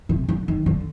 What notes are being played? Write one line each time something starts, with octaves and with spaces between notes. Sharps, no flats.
C3
D3
D#3
D3